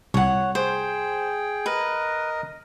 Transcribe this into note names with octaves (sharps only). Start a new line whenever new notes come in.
C2 C#5 F#5
G#4 C5 G5
A#4 B4 D#5